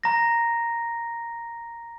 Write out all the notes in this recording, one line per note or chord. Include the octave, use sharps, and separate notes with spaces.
A#5 A#6